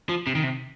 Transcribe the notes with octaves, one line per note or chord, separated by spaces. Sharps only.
F3
C3
D#3
C3